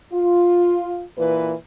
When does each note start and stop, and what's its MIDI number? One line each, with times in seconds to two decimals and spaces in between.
0.13 1.02 65
1.17 1.51 46
1.17 1.51 52
1.17 1.51 71